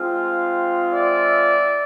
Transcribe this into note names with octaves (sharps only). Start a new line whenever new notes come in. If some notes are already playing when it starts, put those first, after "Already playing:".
Already playing: G#3 C4 F4
D5 E5